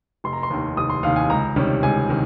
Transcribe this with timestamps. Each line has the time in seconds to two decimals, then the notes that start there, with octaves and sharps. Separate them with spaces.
0.24 F1 C6
0.33 A#5
0.43 C6
0.50 D#2 D#3
0.77 F1 D#6
0.90 C6
1.03 D#2 D#3 F5
1.16 G#5
1.30 C#2 A#5
1.56 C3 D#3 G3 C#4
1.83 C#2 G#5
2.09 C3 D#3